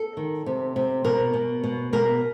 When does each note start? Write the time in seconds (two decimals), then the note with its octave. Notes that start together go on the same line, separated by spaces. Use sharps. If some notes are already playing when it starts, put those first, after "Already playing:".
Already playing: A4
0.17 D#3
0.46 C3
0.76 C3
1.05 B2 A#4
1.34 B2
1.64 B2
1.93 B2 A#4